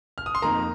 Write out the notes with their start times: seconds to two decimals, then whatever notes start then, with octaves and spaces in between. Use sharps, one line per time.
0.18 F6
0.26 D#6
0.35 C6
0.42 F2 D#3 A#3 A#5